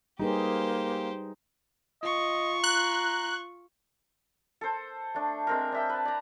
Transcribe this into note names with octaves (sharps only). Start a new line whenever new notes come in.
G3 A#3 D#4 G4 G#4 B4 C5
F4 D#5 C#6
A#5 F#6
A4 C5
A3 D4
G#3 C4 A#4
D4 E5 G5
B4 A5
D5 A#5